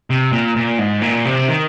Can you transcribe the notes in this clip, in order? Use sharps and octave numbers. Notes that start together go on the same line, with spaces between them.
C3
A#2
A#2
G#2
A#2
C3
D#3